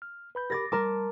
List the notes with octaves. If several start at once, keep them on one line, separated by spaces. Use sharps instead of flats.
F6
B4 B5 G6
G4 A#4 B5 D6 A6 A#6
G3 A#4 A5 C6 D6